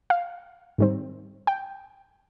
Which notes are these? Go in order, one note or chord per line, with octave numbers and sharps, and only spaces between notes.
F5
G#2 D#3 G3 C4
G5